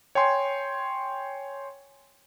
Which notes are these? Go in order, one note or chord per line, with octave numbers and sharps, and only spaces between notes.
C#5 G5 G#5 C6